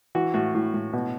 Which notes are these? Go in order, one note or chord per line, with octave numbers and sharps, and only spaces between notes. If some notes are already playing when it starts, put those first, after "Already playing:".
E3 F#4
A2 F#4
A2
A2
B2